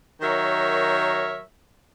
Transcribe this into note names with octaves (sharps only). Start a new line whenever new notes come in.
D#3 F#3 A#4 C#5 E5